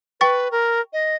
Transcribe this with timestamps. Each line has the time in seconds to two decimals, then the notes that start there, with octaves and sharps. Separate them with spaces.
0.21 B4 G5 C#6 A6
0.52 A#4
0.93 D#5